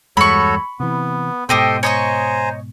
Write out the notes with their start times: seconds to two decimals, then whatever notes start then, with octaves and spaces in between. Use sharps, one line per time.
0.17 E2 G2 G#3 F#4 A4 C#5 B5 C#6
0.80 C3 E3 B3
1.49 G#2 B2 G4 A4 C5 D#5 G5 C6
1.83 C5 C#5 D#5 G#5 A#5 C#6